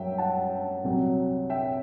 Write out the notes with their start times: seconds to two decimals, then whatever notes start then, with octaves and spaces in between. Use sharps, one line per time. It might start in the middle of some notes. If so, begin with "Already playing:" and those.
Already playing: F#2 F#3 E5 G5
0.18 F#5 A5
0.84 C2 C3 F#3
1.50 E5 G5